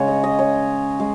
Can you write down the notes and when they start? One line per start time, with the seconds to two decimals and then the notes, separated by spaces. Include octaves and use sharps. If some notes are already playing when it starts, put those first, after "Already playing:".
Already playing: C#3 G#3 C#5
0.08 D#5
0.24 D#5
0.39 C#5
1.00 G#3